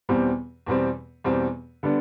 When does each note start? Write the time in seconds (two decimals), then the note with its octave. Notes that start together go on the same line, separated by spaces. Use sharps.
0.09 E2 B2 G3 C4
0.66 E2 B2 G3 C4
1.24 E2 B2 G3 C4
1.83 D3 G3 B3 D4